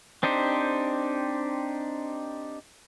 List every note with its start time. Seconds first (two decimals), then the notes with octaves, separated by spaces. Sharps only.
0.23 C4 D4 D#4 G4 C5